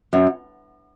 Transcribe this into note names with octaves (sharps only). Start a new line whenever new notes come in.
F#2